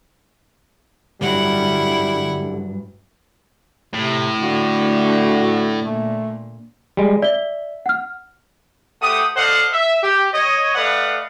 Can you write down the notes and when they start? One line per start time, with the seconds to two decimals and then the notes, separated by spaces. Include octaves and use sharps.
1.21 G2 D3 F#3 G3 E4 F#5
3.94 A2 C3
4.41 D3 A3 F#4
5.83 A#2 A3
6.97 G3 G#3
7.22 D5 E5 G7
7.86 F#5 F6
9.01 A3 G4 C5 F#5 D#6
9.36 A4 C5 D5 D#5 F5 F#5
9.73 E5
10.03 G4
10.33 C#5 D#5
10.75 A3 B4 D5 D#5 F5 F#5